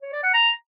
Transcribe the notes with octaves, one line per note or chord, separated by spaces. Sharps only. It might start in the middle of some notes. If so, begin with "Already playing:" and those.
C#5
D5
F#5
A#5